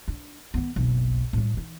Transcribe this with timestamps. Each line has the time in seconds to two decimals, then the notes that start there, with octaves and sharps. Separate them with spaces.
0.08 D4
0.54 D#3 B3
0.76 F#1 B1
1.33 A2 G3
1.53 E3 D#4